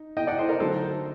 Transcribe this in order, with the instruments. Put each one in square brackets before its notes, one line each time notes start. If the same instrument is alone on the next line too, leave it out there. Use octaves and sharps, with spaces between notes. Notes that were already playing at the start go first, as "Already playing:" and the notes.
Already playing: [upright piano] D#4
[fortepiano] D#5 G5
D5 F#5
C5 D#5
A#4 D5
[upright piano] D3 F#3 A3 D#4 [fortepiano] A4 C5